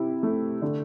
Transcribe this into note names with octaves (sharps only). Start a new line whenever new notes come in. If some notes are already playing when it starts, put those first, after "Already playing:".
Already playing: C3 E4
A3
D3